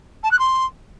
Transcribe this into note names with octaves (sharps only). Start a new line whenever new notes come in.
A5
F#6
C6